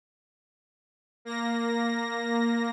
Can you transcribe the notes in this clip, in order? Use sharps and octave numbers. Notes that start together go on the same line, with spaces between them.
A#3 A#6